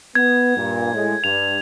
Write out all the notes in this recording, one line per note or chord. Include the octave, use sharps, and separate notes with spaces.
B3 G#6
G2 A#2
A2 G#3
G2 F7